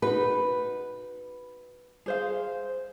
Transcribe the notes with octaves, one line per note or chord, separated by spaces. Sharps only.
D#4 F#4 B4
G#4 C5 F5